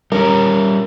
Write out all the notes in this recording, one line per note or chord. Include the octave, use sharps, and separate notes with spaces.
G3 C#4 A#4